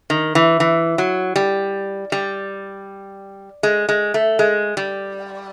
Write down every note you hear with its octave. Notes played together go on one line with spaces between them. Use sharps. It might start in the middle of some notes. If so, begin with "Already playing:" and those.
D#3
E3
E3
F#3
G3
G3
G#3
G#3
A3
G#3
G3